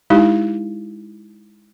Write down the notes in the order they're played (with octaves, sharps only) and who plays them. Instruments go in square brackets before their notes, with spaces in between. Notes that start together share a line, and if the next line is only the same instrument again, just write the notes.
[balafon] G#3 D#4 E4 G4